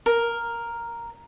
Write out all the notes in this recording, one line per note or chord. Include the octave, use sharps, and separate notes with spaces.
A#4